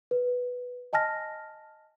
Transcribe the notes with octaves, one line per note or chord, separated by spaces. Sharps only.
B4
D#5 G#5 A5 F6 A#6